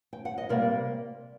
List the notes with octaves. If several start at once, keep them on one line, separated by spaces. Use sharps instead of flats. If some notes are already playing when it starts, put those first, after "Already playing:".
G5
F#5
D#5
C3 G3 A#3 A#4 D5